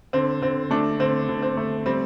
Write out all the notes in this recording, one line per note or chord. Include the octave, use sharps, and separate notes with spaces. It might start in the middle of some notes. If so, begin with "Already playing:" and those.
D3 C4
D3 C4
A3 D4
D3 C4
D3
C4
A3
G3 C4